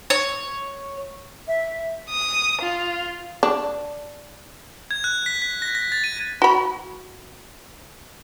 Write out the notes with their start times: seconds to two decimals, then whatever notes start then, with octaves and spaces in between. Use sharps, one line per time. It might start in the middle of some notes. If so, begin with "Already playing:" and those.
0.10 C#5
1.48 E5
2.10 D#6
2.61 F4
3.43 D4
4.91 G#6
5.04 F#6
5.26 B6
5.42 B6
5.62 A#6
5.75 A#6
5.92 A6
6.04 D#7
6.42 F#4 B5